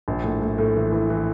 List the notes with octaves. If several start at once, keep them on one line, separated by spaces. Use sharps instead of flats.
A#1
A2
A2
A2
E3
E3
E3